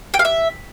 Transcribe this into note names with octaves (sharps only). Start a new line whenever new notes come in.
G5
F5
E5